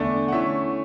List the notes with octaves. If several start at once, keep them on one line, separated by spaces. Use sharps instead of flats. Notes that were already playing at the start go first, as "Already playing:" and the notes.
Already playing: E2 D3 A3 D4
F#5
D3 A3 C#4 E4 E5